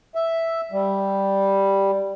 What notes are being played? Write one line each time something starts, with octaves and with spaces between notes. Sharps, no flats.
E5
G3